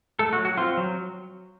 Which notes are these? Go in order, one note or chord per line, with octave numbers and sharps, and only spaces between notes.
A3 A4
F#4
F#3
F#4
C4 F4
F#3